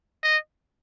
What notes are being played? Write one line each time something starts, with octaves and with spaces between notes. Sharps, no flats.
D#5